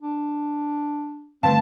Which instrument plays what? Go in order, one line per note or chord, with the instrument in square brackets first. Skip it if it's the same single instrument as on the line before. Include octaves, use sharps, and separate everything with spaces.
[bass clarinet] D4
[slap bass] G2 D3 D#3 [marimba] A3 B4 F5 [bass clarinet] C4 [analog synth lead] A5